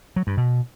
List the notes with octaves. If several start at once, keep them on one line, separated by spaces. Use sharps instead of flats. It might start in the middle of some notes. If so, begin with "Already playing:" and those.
F#3
G2
B2